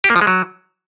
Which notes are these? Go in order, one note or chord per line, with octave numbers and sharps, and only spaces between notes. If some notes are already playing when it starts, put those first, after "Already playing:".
G4
A#3
F3
G#3
F#3